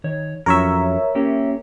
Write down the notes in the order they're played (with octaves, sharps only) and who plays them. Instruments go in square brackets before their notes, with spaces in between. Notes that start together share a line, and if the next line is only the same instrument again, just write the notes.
[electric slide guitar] D#3 C#5
[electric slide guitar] F2 F#3 C#4 [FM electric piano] A#4 C#5 E5
[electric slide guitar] A#3 C#4 G4